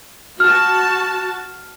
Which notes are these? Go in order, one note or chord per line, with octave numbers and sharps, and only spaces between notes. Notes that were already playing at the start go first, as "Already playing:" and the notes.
F#4 A5 F6